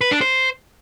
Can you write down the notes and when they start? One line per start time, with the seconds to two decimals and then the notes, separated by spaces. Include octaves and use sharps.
0.01 B4
0.11 D4
0.21 C5